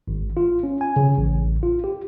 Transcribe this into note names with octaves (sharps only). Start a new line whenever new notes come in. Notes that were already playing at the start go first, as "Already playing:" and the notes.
G#1
F4
C#4
G#5
C#3
A1
F4
G4